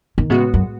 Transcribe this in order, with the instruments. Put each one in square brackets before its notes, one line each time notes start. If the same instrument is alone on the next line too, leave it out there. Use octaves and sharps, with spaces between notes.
[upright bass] D#3
[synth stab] A2 G#3 B3 F#4 [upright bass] C#3
[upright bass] F#2